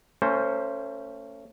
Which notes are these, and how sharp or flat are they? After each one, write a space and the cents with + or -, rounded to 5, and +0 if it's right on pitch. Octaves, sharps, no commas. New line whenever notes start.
A3 +40 C#4 +5 C5 +0